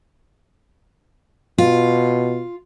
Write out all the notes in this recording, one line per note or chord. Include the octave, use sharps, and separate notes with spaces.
B2 F4